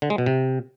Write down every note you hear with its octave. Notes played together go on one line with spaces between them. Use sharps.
D3
G#3
B2
C3